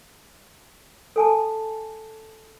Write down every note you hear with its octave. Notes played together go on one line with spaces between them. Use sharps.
A4 G#5 A5